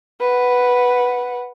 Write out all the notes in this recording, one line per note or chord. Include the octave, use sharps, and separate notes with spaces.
B4 F#5